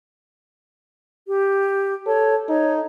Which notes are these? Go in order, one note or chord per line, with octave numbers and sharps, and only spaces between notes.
G4
A4 C#5
D#4 C#5